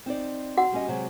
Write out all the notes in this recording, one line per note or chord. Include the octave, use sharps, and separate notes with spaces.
C4 D#4 D5
F#4 F#5
G3 C#4 D#5
C3 F#3 G#3